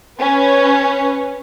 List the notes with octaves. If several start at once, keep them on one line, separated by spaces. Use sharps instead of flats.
C#4 B4